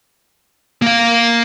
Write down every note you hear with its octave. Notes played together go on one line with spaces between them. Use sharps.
A#3 F5